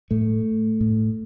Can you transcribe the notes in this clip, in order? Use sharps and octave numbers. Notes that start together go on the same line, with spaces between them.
A2 A3
A2